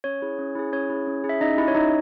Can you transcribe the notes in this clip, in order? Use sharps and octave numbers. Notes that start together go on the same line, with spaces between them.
C#4 C#5
E4 G#4
C#4
E4 G#4
C#4 C#5
E4 G#4
C#4
E4 G#4
E5
C#4 D#4 D#5
E4 G4 E5
C#5
C#4 D#4 D#5